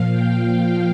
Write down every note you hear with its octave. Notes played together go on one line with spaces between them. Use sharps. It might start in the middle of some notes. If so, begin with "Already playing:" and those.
Already playing: A#2 F3 F5
G5
F5